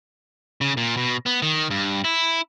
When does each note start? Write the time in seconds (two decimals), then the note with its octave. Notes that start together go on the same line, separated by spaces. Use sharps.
0.61 C#3
0.77 A#2
0.97 B2
1.26 B3
1.42 D#3
1.70 G2
2.04 E4